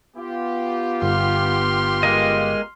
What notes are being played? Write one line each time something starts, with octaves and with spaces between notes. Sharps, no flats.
B3 F4 G4
G1 C6 F6
G#3 A#4 D#5